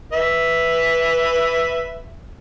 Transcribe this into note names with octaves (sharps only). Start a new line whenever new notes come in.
B4 E5